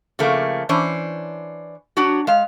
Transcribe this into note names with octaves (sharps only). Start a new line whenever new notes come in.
C#3 F3 A3 A#3
E3 C#4 D4 C5
F#3 D4 F#4
G#3 F5